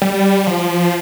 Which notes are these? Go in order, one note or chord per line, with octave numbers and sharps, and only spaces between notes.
G3
F3